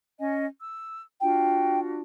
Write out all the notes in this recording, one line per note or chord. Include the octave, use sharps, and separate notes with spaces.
C#4 D#5 G#5
E6
D4 F4 F#4 G5